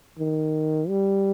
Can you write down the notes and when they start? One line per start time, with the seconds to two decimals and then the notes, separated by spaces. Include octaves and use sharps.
0.19 D#3
0.88 G3